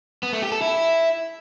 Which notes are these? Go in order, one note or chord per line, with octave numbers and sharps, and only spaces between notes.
B3
A3
G4
A4
E4